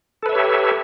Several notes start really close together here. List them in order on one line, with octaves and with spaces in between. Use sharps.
A4 B4 E5 C#5 G4